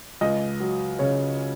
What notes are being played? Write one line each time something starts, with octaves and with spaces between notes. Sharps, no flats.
C#2 D#5
F#3
C#3 C#5